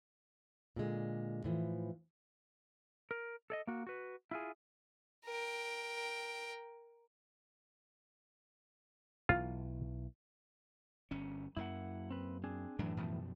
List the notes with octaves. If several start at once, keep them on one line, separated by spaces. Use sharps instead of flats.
A#2 D3 G#3
A2 E3 F3
A#4
A4 D5 D#5
A#3 F#4
F#4 B4
E4 F4 G#4
A#4 G5
B1 E3 F4
G1 C#4
F#2 A#3 E4 F#5
C4 B4
C4 D4 G#4
F#2 A2 E3 F#3 D4
F#2 B2 F3